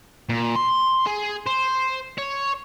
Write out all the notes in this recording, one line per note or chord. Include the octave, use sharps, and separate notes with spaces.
A#2
C6
G#4
C5
C#5